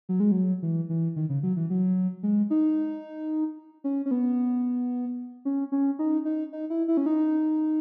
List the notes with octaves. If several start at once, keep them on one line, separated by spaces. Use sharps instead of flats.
F#3
G#3
F#3
E3
E3
D#3
C#3
F#3
E3
F#3
G#3
D#4
C#4
C#4
B3
C#4
C#4
D#4
D#4
D#4
E4
E4
C#4
D#4